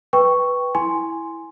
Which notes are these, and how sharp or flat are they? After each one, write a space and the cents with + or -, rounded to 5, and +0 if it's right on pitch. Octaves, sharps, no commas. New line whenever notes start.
B4 +0 G5 +0 C#6 +0
E4 +0 G#5 +0 C6 +0